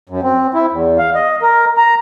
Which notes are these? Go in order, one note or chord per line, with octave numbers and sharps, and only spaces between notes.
F#2
C4
E4
E2
F5
D#5
A#4
A#5